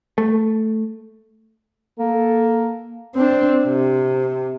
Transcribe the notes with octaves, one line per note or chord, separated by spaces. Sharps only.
A3
A#3 A4
C4 D4
C3